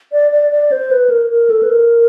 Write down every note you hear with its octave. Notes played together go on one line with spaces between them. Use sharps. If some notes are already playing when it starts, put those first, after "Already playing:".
D5
D5
D5
C5
B4
A#4
A#4
A4
B4
A#4